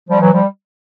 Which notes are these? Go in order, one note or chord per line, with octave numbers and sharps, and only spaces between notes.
F3 G3
E3 F#3
F3 G3